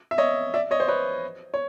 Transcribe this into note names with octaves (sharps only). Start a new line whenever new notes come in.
E5
C#5 D#5
D5 E5
C#5 D#5
C5
B4 C#5
C#5